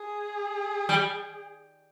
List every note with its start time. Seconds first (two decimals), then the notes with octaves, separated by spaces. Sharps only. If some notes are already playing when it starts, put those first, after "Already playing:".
Already playing: G#4
0.89 G3